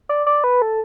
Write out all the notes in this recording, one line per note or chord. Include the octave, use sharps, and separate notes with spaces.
D5
D5
B4
A4